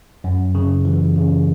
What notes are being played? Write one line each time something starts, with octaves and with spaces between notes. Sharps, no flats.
F#2
C#3
E3
C#3